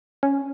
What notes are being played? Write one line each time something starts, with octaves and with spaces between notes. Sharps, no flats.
C#4